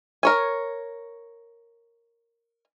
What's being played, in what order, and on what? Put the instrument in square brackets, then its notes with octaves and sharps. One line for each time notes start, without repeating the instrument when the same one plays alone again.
[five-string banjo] A#4 C#5 G#5